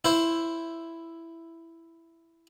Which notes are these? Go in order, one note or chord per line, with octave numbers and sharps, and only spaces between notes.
E4 C5